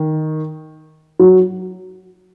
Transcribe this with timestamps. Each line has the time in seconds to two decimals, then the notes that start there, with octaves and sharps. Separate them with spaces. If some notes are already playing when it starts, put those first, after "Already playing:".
Already playing: D#3
1.19 F#3